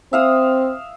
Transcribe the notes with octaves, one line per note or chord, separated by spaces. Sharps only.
C4 E5 F5 D#6